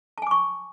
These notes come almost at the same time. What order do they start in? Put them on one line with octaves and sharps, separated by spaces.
A5 G#5 D6 C#6